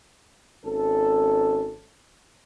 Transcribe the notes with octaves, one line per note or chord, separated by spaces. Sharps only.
G#1 C#4 A4